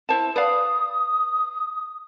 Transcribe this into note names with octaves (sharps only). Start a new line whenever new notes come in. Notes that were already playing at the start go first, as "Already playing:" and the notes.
E4 C5 A5
B4 D5 F5 D#6